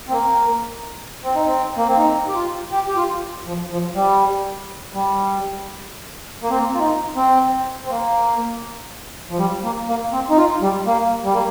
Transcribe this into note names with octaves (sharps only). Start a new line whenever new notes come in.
C4
A#3
C4
D#4
C4
A#3
C4
D#4
G4
F4
G4
G4
F4
F3
F3
G3
G3
A#3
C4
A#3
F4
D#4
C4
C4
A#3
F3
G3
A#3
A#3
C4
D#4
F4
G3
A#3
G3
A#3